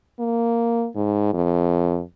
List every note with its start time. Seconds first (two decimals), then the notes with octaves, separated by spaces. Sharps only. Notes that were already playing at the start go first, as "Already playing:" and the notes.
0.20 A#3
0.96 G#2
1.34 F2